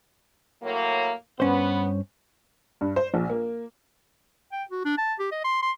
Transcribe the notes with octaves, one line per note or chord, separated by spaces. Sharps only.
A2 F#3 A#3
G2 B3 C#4 C5
G2
C5
A#1
A#3
G5
F#4
D4
A5
G4
D#5
C6
C6